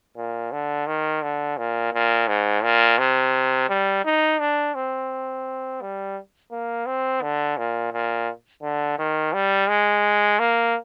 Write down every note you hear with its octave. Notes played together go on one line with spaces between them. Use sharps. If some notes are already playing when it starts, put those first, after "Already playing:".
A#2
D3
D#3
D3
A#2
A#2
G#2
A#2
C3
G3
D#4
D4
C4
G3
A#3
C4
D3
A#2
A#2
D3
D#3
G3
G#3
A#3